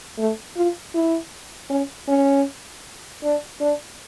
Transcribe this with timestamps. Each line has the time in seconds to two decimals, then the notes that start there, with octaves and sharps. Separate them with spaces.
0.18 A3
0.56 F4
0.95 E4
1.70 C#4
2.08 C#4
3.24 D4
3.61 D4